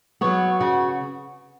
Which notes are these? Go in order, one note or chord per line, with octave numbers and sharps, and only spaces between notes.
F#3 B3 C#5
C#3 F#4